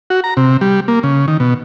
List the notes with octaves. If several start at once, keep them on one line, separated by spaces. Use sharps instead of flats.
F#4
A#5
C3
G3
A#3
C#3
D#3
B2